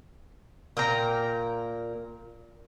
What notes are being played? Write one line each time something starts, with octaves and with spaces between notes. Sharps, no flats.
A#2 A#4 G5 A#5